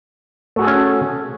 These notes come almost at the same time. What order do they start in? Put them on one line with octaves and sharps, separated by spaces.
A3 F#4 G#4 A4 C#4